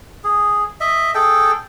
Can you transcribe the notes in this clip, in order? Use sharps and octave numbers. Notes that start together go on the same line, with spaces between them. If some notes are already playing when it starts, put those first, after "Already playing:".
G#4
D#5 E5
G#4 A4 G5